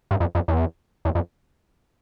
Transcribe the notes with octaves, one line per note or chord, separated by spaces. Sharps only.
G2
F2
F2
E2
E2
F2